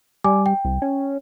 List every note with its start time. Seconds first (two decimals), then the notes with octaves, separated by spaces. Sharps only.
0.24 G3 D5 G#5 D6
0.46 G5
0.65 C2
0.82 C#4